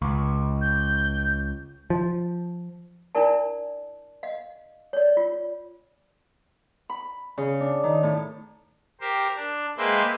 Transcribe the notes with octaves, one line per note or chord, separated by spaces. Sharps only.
C#2
G6
F3
D4 E4 A#4 D5 A5
D#5 F5
C#5 D5
F4
B5
C#3
D4
D#3
A2
G4 A#4 C5
D4
G#3 A#3 B4 C5 E5 G5